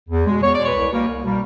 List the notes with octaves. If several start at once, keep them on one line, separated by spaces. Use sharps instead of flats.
E2
B2 G#3
E2 C#5
D5
B2 G#3
B4 C#5
C2
B2 G3 A#3
C2
B2 G3 A#3